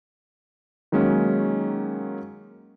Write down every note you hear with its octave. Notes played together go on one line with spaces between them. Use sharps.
D#3 F#3 G#3 A#3 C#4 D#4